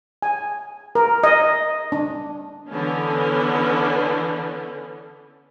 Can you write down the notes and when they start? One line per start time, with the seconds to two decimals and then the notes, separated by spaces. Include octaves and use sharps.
0.22 G#5
0.95 A#4
1.24 D#5
1.92 D4
2.69 D3 E3 B3 C#4